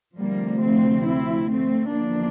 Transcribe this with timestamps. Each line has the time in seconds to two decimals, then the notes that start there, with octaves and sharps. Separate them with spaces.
0.18 D2 C3 F3 G3 A#3
0.62 A3 C4
1.06 C4 E4
1.49 A3 C4
1.93 E2 D3 F3 A#3 D4